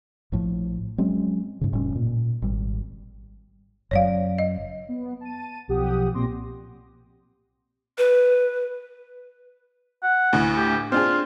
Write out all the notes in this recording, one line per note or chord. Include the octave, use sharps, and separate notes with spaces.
A#1 A2 F3
F#3 G#3 C4 C#4
G#2 C#3
F1 A2 G3 C#4
A#2
G#1 G3
F#1 F#2 F#3 C#5 D5 F5
D#5
B3
A5 D#7
B1 F3 G4 F#5 D#6
A#1 A#2 C4 C6 D6 A#6
B4
F#5
D2 A2
G4
C4 D4 F4 G#4